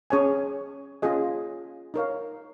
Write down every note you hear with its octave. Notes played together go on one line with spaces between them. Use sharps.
C#4 G#4 C#5 G#5
C#4 F4 G#4 D#5
D#4 A#4 C#5 F5